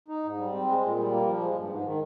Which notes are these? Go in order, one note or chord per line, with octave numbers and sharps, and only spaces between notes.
D#4
G#2
G3
C4
G#3
A#2
G3
A#3
F3
G#3
G2
G#2
D#3